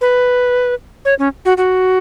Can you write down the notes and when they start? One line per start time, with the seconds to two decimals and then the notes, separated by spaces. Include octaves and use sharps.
0.01 B4
1.05 C#5
1.19 C#4
1.45 F#4
1.57 F#4